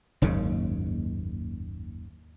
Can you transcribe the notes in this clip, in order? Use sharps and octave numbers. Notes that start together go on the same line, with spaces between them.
F#1 D#2 G#2 C#3